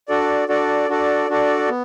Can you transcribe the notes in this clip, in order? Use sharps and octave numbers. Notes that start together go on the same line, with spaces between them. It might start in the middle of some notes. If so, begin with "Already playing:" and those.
D4 F#4 A4 D5
D4 F#4 A4 D5
D4 F#4 A4 D5
D4 F#4 A4 D5
B3